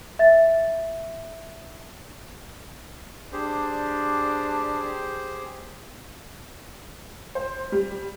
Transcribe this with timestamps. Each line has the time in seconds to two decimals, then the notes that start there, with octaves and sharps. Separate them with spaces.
0.19 E5 A6
3.32 D4 G4 G#4 C5
7.35 C5
7.72 G3